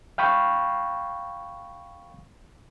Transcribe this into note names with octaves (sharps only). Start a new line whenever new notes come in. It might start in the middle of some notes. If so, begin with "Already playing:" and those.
F5 G5 B5 C#6